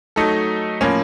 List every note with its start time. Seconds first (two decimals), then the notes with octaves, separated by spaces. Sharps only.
0.16 F#3 A3 D#4 A4
0.81 A2 F3 A#3 C#4